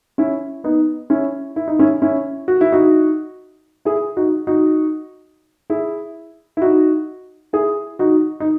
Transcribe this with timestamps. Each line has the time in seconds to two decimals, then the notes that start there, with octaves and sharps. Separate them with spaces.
0.18 C#4 E4
0.64 B3 D#4
1.10 C#4 E4
1.56 E4
1.68 D#4
1.79 C#4 E4
2.02 C#4 E4
2.48 F#4
2.61 E4
2.72 D#4 F#4
3.85 E4 G#4
4.17 D#4 F#4
4.47 D#4 F#4
5.70 E4 G#4
6.57 E4
6.62 D#4 F#4
7.53 E4 G#4
7.99 D#4 F#4
8.40 D#4